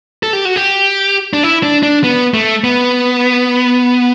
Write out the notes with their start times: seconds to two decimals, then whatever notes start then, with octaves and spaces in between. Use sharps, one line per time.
0.23 A4
0.33 G4
0.45 F#4
0.56 G4
1.33 D4
1.43 E4
1.63 D4
1.83 D4
2.04 B3
2.34 A3
2.64 B3